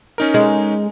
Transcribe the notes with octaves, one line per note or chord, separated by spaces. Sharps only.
C#4 D#4 A#4
G#3